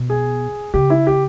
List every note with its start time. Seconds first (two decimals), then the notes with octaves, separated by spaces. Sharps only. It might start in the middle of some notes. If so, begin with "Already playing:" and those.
Already playing: B2
0.10 G#4
0.74 C#3 G4
0.90 E4
1.07 G4